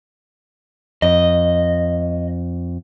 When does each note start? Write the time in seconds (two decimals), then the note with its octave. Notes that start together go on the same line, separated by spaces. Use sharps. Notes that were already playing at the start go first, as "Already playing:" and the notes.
1.02 F2 D#5